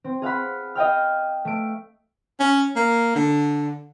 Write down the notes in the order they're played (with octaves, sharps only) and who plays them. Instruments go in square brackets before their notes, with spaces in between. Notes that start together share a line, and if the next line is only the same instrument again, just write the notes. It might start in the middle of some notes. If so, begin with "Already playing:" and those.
[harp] C4
G#4 F5 F#5 B5
D#5 F5 G5 F6
A3 D7
[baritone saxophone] C#4
A#3
D3